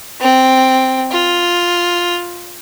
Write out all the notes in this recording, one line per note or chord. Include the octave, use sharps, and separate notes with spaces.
C4
F4